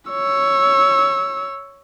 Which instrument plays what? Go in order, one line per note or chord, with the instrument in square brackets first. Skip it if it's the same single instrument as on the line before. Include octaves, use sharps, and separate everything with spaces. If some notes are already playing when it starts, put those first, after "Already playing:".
[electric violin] C#5 E6